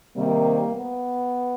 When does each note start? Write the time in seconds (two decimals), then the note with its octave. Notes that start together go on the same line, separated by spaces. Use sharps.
0.16 C3 D#3 G3 A#3
0.76 B3